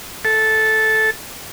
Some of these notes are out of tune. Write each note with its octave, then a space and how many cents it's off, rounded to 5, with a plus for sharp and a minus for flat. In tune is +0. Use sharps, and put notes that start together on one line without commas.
A4 -10